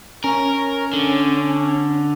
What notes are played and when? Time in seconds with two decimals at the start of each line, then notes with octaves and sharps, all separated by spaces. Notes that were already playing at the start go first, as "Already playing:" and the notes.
0.24 C#4 A#4
0.93 D3